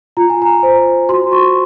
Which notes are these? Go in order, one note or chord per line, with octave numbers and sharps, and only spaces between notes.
F4 A#5
G#5
A#5
C5
F#4 C6
C#6